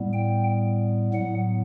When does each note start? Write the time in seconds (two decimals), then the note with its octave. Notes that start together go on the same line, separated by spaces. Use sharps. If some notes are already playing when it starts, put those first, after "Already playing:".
Already playing: A2 G3 B3
0.13 G5
1.14 A2 F#3 B3 F#5